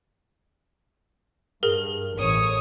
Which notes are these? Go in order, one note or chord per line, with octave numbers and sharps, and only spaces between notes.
G2 G#4 A#4
A1 C#5 D#6